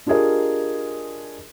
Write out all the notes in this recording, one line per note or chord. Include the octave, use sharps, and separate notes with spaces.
D4 F4 G4 G#4 A#4 D#5